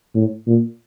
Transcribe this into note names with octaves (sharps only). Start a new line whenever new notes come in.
A2
A#2